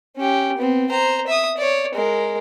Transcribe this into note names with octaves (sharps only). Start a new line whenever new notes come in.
C#4 G4
B3 C4
C5 A#5
E5 D#6
C#5 D5
G#3 A#4